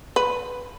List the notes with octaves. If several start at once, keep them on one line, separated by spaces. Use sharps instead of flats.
B4